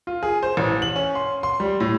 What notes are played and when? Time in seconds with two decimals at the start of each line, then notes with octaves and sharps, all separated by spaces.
0.07 F4
0.23 G#4
0.43 C5
0.57 A1
0.82 F#7
0.96 C#4
1.15 C6
1.43 C6
1.60 G3
1.80 A2